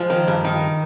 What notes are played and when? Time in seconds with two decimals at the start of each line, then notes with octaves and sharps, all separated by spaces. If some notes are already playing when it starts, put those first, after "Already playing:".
Already playing: F3 G#3
0.10 D#3
0.27 G2
0.45 D#3